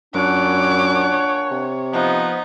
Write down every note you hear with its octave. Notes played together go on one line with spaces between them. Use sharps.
F#2 A#2 D4 C#5 F#5 D6
C3
F3 B3 D#4